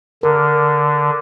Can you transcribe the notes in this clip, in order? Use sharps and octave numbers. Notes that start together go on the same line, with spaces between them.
D3 A#4